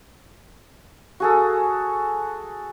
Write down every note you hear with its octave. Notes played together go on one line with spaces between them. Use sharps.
F#4 G#4 A4